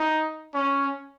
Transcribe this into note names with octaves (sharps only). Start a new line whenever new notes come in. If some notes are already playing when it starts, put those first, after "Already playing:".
Already playing: D#4
C#4